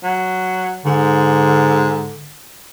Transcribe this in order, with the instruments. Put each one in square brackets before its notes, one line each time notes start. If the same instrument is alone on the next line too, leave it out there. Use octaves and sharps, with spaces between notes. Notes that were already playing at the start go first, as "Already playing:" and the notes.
[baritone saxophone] F#3
[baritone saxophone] G#2 [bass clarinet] D3